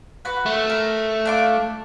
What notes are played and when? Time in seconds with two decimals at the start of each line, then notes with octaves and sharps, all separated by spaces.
0.25 F#4 B4
0.46 A3
0.70 A#4
1.26 D4 F4 D6